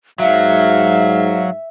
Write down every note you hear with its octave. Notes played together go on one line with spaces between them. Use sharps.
G#2 F#3 E5 F5